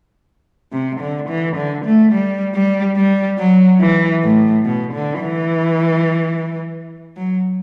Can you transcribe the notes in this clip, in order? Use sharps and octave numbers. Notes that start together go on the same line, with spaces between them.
C3
D3
E3
D3
A3
G3
G3
G3
F#3
E3
A2
B2
D3
E3
F#3